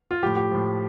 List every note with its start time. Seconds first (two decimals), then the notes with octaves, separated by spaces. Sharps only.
0.11 F4
0.23 A2 F3 G4
0.36 G4
0.51 A2 F3